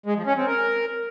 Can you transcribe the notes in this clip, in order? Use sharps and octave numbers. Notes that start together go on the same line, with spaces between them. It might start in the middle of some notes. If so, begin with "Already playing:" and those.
G#3
F3
C#4
C4
A#4